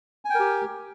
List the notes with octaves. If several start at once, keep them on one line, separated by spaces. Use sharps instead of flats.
G4 A#4 G5 G#5